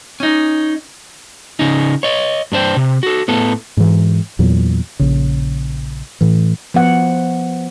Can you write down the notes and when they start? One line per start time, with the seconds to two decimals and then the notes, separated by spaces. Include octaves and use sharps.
0.20 C#4 D#4
1.59 C#3 C#4 D#4
2.03 C#5 D#5
2.52 G2 D4 C5 G5
2.77 C3
3.03 F#4 A4
3.28 A2 B3 A4
3.77 G#2 E3
4.39 E2 A#2 F#3
5.00 A#1 C#3
6.21 A2 E3
6.74 F3 B3 F#5